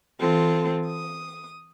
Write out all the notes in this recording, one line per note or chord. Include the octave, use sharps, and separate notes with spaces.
E3 C4 F4 A4
D#6